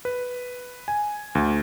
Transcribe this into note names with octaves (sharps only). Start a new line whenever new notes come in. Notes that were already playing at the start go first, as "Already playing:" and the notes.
B4
G#5
D2